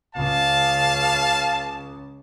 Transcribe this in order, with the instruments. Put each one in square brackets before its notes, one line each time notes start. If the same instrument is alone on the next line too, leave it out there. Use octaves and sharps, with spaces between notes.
[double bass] C#2 C#3 [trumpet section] F5 A5